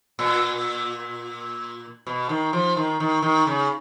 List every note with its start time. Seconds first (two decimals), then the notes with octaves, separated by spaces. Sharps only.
0.19 A#2
2.07 B2
2.29 D#3
2.53 F3
2.77 D#3
3.00 D#3
3.22 D#3
3.47 C#3